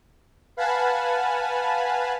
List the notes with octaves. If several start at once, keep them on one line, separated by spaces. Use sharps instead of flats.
B4 F5 F#5 G#5 A5 B5